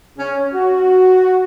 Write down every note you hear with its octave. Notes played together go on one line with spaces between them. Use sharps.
C#4
F#4